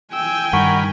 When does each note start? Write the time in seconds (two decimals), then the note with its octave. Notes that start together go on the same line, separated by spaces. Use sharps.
0.13 G5 G#5 E6
0.53 G2 D#3 A#4 F#5 B5 C#6